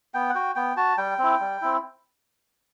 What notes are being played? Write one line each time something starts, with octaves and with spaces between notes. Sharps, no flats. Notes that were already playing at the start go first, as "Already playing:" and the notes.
B3 G5
F#5
F#4 G5
B3 G5
F#4 A5
G3 G5
C4 E4
G3
C4 E4